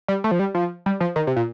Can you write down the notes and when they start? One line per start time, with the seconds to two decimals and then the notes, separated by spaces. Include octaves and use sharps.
0.08 G3
0.24 A3
0.31 F3
0.39 G3
0.55 F3
0.86 G3
1.01 F3
1.16 D#3
1.27 C3
1.36 A#2